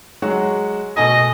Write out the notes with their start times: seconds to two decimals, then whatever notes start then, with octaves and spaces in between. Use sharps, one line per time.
0.22 F#3 G#3 F#4
0.97 B2 A3 D#5 G#5